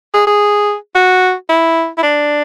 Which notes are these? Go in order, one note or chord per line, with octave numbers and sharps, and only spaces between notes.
G#4
G#4
F#4
E4
E4
D4